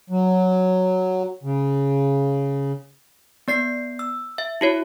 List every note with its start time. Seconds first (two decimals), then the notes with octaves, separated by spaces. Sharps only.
0.10 F#3
1.43 C#3
3.48 B3 D5 C7
3.99 E6
4.38 E5
4.61 E4 F#4 C#5